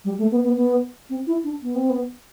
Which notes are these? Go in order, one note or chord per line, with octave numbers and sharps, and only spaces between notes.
G3
A3
B3
B3
B3
C4
E4
D4
B3
C4
B3